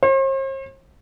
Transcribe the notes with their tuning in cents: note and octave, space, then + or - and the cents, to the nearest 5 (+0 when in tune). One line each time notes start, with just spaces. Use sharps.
C5 +45